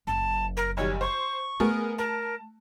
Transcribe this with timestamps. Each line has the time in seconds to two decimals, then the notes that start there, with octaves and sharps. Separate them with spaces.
0.07 F#1 A5
0.57 A#4
0.77 B1 D#3 G3 C#5
1.01 C5 C#6
1.60 A3 B3 G#4 A#4
1.98 A#4 A5